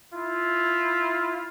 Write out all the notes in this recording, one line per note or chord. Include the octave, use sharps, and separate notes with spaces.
E4 F4